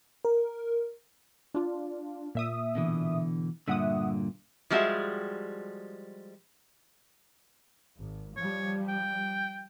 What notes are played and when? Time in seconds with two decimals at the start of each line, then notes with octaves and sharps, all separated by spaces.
0.25 A#4
1.54 D4 F4
2.35 A#2 E5 D#6
2.75 B2 D3 E3
3.68 G2 A#2 D3 E5 F#5 D#6
4.70 F3 G3 G#3 D4 F#4 E5
7.97 G#1
8.37 F3 G3 C#5
8.89 G5